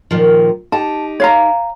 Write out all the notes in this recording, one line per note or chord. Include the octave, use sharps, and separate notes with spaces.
A#2 D#3 F3
D#4 G4 A5
C#5 F5 A#5